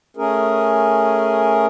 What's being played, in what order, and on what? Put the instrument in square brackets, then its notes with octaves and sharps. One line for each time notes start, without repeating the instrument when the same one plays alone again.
[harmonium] A3 C#4 G#4 A#4